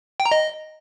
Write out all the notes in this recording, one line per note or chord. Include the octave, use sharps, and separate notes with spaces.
G5
A#5
D#5